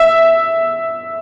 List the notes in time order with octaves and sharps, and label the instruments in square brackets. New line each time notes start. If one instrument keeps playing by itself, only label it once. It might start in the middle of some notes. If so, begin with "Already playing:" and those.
Already playing: [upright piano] E5